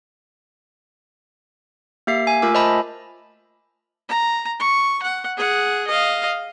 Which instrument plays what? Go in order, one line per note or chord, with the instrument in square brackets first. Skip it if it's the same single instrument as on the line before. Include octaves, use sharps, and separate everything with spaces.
[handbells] A#3 G4 E5 C7
G#5
A3 F4 A#4 D6 E6
C5 D#5 E5 G#5 A5 B5
[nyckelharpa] A#5
C#6
F#5
G#4 F#5
D#5 F5